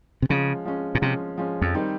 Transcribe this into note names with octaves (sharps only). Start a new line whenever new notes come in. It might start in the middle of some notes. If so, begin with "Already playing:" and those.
C3
C#3 F3 G#3 C#4
F3 G#3 C#4
A#2
C3 F3 G#3 C#4
F3 G#3 C#4
F2
D#3 G3 C4 D#4